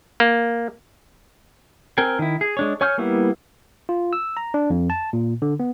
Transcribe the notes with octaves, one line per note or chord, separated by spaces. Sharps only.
A#3
C4 A#4 G5 G#5
D#3 E4
G#4
G#3 D4 C#5
C#5 G#5 C#6 F6 G6
G3 A#3 B3 E4
F4
E6
A#5
D4
F2
A5
A#2
D3
B3